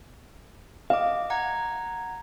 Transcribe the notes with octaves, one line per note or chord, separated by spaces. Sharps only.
D#5 F5 D6
F#5 A#5 G#6